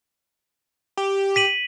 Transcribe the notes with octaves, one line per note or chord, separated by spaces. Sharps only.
G4
B6 D#7 F#7